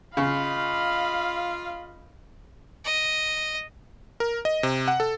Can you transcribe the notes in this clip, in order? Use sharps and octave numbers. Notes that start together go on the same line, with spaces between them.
C#3 F4 D#5 F5 B5
D#5
A#4
D#5
C3
F#5
A4